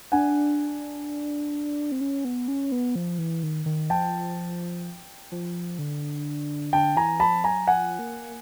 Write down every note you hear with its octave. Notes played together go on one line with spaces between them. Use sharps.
D4 F#5 G#5
C4
C#4
B3
C#4
B3
F3
E3
D#3
D#3
F3 G5 A5
F3
D3
D3 G5 A5
E3 G#5 A#5
F3 A5 B5
F#3 G#5 A#5
F3 F#5 G#5
A#3